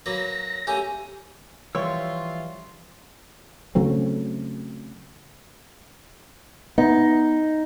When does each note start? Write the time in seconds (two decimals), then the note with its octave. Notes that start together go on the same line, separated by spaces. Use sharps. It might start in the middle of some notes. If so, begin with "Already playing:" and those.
0.06 F#3 A#3 B4 A#6
0.67 A3 A#3 C#4 G4 G#5
1.75 E3 F3 G3 F4 C#5 E5 C6 E6
3.75 C#3 F#3 A3 C4
6.78 B3 D#4